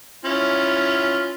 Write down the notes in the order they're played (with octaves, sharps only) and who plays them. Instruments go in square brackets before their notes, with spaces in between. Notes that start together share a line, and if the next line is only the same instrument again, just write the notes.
[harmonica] C#4 E4 F4